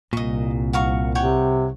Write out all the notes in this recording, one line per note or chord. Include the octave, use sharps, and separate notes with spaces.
C2 A#2 D#5 C#6
F#4 F5 C#6
C3 C#5 F#5 G5